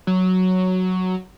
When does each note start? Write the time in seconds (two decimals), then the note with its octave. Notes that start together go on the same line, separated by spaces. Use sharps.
0.07 F#3